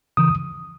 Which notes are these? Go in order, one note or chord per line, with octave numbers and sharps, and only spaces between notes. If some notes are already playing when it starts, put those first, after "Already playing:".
C#3 E3 D#6